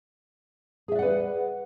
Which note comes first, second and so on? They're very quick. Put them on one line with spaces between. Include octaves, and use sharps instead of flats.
G#4 E5 D5 F#5 B4